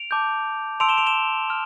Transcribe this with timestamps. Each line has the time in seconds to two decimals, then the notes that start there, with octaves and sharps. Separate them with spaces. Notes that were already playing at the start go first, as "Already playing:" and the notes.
Already playing: D7 F7
0.11 A5 D6 G6
0.80 A5 C6 E6 D7 F7
0.89 E7 G7
0.97 D7 F7
1.06 E7 G7
1.50 F6